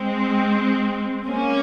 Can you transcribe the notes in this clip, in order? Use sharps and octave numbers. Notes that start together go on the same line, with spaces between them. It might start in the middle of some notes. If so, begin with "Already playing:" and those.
Already playing: G#3 C4
A#3 C#4